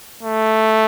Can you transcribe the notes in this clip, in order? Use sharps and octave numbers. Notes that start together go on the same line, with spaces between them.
A3